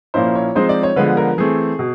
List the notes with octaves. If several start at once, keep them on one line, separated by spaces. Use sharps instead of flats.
A#2 F3 A#3 C#4 E4 C5
C#5
F3 G#3 C4 D#4 C5
D5
C#5
D3 F3 G#3 B3 B4
A#4
E3 A3 C4 G#4
B2